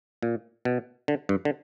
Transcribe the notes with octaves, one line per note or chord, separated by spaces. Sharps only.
A#2
B2
D3
G2
D3